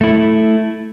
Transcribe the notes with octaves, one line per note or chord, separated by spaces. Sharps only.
A3 E4